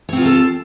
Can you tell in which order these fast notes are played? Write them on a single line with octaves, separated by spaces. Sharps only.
C#5 C4 F4 G#4 A4